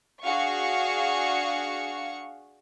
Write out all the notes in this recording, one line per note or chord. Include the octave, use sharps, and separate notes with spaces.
D4 F#4 G#4 F5 C#6 C#7